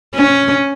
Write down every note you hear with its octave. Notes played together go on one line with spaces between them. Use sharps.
C#4